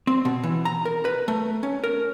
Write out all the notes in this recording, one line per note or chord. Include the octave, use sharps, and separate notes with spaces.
C4
B2
E3
A#5
A#4
B4
A3
C#4
A#4